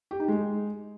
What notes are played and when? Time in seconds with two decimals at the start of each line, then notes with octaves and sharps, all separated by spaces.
0.11 G4
0.20 D#4
0.28 G#3